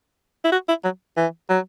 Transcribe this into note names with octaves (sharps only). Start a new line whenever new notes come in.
E4
F#4
E4
F#3
E3
F#3